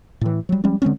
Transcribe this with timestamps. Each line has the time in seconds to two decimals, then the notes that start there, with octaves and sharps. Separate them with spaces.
0.21 A2 E3
0.49 F#3 G3
0.64 F3 G3 G#3 C#4
0.82 D3 G#3 C4 C#4